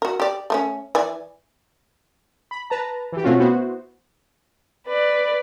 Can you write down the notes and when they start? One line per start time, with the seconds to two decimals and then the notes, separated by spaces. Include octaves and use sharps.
0.02 F#4 A#4
0.20 G4 D5
0.50 A3 A#3 C#4
0.95 E3 D5 G#5
2.51 B5
2.70 B4 A5 A#5
3.12 E3 G4
3.24 B2 A3 C4 C#4 F4 F#4
3.39 B3 E4 F#4 C5
4.87 B4 D5